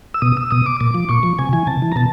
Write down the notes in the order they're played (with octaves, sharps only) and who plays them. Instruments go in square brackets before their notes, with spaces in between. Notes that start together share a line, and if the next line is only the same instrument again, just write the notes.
[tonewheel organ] E6
B2 D#6
E6
B2 D#6
D6
A#2 D6
F3
A#2 C#6
F3
C3 G#5
E3 G#5
C3 A5
E3
A#5
B2 A5